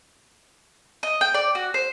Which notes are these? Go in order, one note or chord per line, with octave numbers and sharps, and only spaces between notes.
D#5
G5
D5
F#4
C5